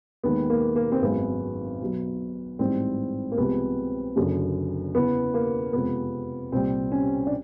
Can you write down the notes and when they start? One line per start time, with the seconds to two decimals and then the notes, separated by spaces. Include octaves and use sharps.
0.24 D#2 D#3 G#3 B3
0.50 A#3
0.76 A#3
0.92 C4
1.02 G#1 F#2 D#3 G#3 B3
1.81 B1 B2 F#3
2.59 A1 G#2 E3 G3 C4
3.32 A#3
3.37 C2 C3 F3 G#3 B3
4.16 F#1 F#2 D3 F#3
4.95 E2 C#3 E3 B3
5.34 A#3
5.73 F2 C3 F3 G#3 B3
6.52 C2 A#2 G3 C4
6.92 C#4
7.27 D4